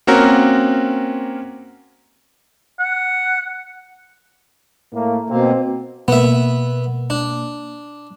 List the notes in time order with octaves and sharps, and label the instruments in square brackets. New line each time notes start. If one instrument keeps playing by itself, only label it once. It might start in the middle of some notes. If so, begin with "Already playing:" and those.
[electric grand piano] A#3 C4 C#4 F#4 A#4
[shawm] F#5
[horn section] A2 A3 A#3
[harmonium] B2 A#3 [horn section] C4
[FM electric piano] B2 A#3 [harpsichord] B3 E5
[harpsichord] D4